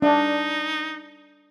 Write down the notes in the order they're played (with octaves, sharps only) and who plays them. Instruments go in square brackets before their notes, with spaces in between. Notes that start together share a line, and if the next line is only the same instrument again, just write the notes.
[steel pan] D4 [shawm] D#4